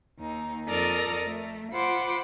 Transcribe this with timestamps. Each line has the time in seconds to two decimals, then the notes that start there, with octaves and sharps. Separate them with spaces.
0.18 D#2 D#4
0.66 F2 A4 A#4 D5 A#5 D#6
1.24 A3
1.71 F4 C5 F#5 B5 C6 D6